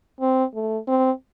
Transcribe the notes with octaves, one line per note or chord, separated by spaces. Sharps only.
C4
A3
C4